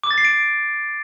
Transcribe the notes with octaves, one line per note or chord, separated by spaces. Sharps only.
D6
A6
C7
D7